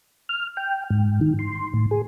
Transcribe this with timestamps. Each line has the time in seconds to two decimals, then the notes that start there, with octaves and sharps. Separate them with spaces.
0.29 F6
0.57 G5
0.90 G#2
1.21 D#3
1.39 C6
1.73 A2
1.91 G#4